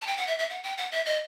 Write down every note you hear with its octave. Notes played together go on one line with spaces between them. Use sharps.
A5
G5
F#5
E5
E5
F#5
G5
F#5
E5
D#5